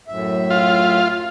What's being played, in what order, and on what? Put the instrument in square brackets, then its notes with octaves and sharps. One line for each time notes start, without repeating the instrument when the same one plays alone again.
[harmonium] F#2 A2 E5
[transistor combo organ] F4